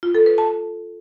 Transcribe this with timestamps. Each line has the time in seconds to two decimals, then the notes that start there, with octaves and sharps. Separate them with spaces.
0.03 F4
0.15 A4
0.26 B4
0.38 A5